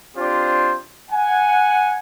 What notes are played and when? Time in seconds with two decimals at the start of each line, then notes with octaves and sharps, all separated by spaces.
0.16 C4 D4 F4 G4 C5
1.10 F#5 G#5